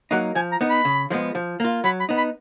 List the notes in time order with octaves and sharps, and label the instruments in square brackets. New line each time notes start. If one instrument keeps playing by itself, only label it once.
[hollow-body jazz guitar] F#3 A#3 D#4 [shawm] F#5
[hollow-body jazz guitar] F3 [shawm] G#5
[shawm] A#5
[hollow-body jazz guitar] B3 D#4
[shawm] B5
[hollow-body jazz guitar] C#3
F3 G#3 B3
F3
A#3 F4
[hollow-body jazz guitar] F#3 [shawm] B5
[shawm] B5
[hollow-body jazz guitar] B3 D#4
[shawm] B5